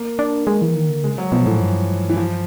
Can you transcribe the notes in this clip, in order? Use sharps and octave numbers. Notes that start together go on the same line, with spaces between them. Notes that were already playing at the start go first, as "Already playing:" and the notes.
Already playing: A#3
D4
G#3
E3
D#3
D3
C#3 G#3
F#3
B2 F3
A2 E3
G2
E3
F3